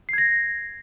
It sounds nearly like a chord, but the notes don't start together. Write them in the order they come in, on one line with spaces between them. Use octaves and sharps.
C7 G#6 A#6